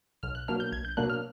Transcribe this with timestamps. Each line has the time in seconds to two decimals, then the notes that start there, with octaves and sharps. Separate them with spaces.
0.23 B1 F6
0.35 F#6
0.48 B2 F#3 A#3 D4 F6
0.60 G6
0.72 B1 G#6
0.85 G6
0.97 B2 F#3 A#3 D4 F#6
1.10 F6